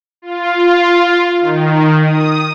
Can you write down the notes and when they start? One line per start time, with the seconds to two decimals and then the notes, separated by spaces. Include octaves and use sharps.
0.22 F4
1.40 D#3
2.04 D#6